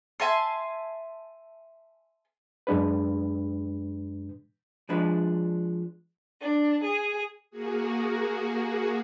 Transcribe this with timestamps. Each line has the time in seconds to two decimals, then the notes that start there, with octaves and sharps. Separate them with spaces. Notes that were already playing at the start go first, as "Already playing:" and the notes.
0.20 E5 G#5 A5 C6
2.67 F#2 G#3 D4 B4
4.89 F3 G#3 D4 B4
6.41 D4
6.83 G#4
7.50 A#3 F#4 G#4